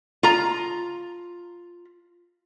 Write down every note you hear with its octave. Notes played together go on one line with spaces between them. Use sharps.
F4 A#5